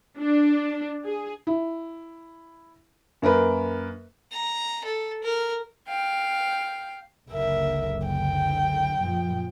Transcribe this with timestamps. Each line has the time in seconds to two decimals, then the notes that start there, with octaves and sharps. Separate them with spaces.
0.19 D4
1.06 G#4
1.47 E4
3.22 F#2 A#3 A#4 B4
4.33 A#5
4.85 A4
5.23 A#4
5.87 F5 G5
7.31 F#1 C#2 D3 A#4 E5
8.07 G5
8.95 F#2 A#2 F3